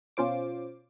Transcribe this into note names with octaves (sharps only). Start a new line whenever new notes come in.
B2 C#4 F4 C5 D6